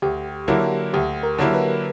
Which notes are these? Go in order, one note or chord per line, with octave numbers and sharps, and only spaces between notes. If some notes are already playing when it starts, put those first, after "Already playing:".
D2 G4
D3 F#3 A#3 E4
D2 G4
A#4
D3 F#3 A#3 E4
B4